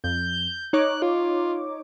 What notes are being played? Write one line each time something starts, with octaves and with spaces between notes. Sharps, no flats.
F2 G6
D#4 C#5 D6 F#6
F4